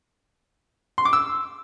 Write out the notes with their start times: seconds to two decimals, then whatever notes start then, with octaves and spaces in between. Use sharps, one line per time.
0.98 C6
1.05 D6
1.13 E6